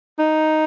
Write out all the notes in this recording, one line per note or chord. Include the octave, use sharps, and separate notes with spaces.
D#4